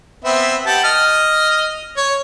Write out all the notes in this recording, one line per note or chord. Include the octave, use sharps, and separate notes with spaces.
B3 C4 E5
G4 F#5 A5
D#5 F6
C#5